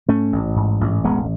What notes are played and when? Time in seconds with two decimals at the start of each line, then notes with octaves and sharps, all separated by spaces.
0.08 G#2 A3 C#4
0.32 A1
0.56 G#2
0.81 A1
1.04 E1 G#3 B3